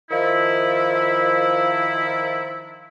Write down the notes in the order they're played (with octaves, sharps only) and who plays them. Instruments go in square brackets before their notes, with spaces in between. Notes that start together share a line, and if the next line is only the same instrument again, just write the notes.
[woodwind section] D#3 F3 E4